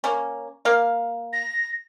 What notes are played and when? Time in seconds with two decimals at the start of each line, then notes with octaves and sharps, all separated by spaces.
0.04 A#3 C#4
0.65 A#3 F5
1.33 A#6